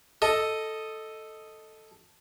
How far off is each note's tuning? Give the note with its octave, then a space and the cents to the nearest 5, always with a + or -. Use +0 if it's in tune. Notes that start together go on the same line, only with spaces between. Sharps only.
A4 +0 D#5 +0